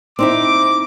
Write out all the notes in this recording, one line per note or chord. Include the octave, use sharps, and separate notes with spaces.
C4 D#4 E4 D6